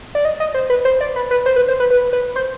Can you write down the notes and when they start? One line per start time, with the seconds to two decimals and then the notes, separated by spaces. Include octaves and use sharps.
0.15 D5
0.25 D#5
0.40 D#5
0.54 C5
0.70 B4
0.85 C5
1.01 D5
1.16 B4
1.31 B4
1.46 C5
1.56 B4
1.68 C5
1.80 B4
1.90 B4
2.13 B4
2.36 C5